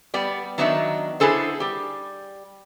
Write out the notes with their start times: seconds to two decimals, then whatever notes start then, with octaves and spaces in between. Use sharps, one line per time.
0.14 G3 B3 D5
0.58 D#3 F#3 B3 D4 D#4 E5
1.20 B3 D4 E4 G#4 A4 C5
1.60 G3 G4